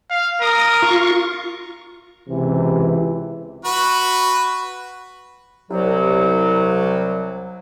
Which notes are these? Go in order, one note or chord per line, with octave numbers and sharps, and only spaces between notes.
F5
A#4 D#6
F4 C#6
C#2 C3 E3
F#4 B4
C2 F#3